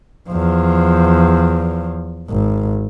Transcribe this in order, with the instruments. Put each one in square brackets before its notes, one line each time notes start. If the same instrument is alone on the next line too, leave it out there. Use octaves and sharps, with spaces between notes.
[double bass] E2 F3
G#1